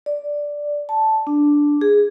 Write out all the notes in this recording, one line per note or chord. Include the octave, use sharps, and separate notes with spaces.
D5
A5
D4
G#4